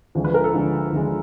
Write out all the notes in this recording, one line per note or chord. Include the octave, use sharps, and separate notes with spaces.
D2 D3 F3 G#3
B4
A#4
A4
D2 D3 F3 G#3
D2 D3 F3 G#3